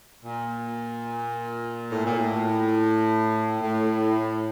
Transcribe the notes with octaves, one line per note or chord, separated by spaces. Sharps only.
A#2
A2
A#2
A2
A2